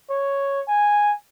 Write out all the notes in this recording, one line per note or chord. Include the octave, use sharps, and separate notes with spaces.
C#5
G#5